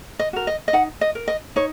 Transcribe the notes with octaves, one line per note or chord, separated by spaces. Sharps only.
D#5
F#4 A#4
D#5
D#5
D#4 F#5
D#5
A#4
D#5
D#4 C#5